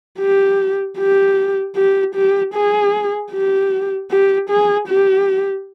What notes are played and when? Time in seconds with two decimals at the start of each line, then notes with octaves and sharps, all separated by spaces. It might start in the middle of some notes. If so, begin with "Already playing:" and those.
0.19 G4
0.98 G4
1.76 G4
2.15 G4
2.54 G#4
3.32 G4
4.11 G4
4.50 G#4
4.88 G4